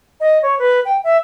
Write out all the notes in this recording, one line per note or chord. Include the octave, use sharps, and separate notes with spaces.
D#5
C#5
B4
G5
E5